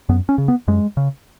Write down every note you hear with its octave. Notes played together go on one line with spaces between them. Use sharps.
F#2 B3
C#4
C#3
B3
F#2 G#3
C#3